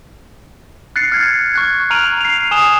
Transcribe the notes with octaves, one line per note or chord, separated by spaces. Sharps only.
F#6 A6 C7 C#7
F6 G#6 C7
C#6 F#6 G#6
A#5 F6 D7 D#7 F7 F#7
C7 F7
G#5 D#6 E7 G7